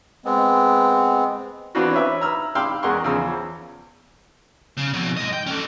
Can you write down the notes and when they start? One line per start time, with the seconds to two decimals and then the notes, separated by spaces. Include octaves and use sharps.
0.25 G#3 B3 C4
1.75 E3 B3 C4 D4 F4 F#4
1.93 C#4 B4 E5 D6
2.21 A#5 B5 E6 F6
2.55 F5 G5 B5 C6 D6 E6
2.82 E2 G#3 A#4 F#5 C6 C#6
3.04 E2 C#3 F3 E6
4.77 C#3
4.93 F2 B2
5.17 G#2 D#5
5.33 G5
5.47 C#4 A4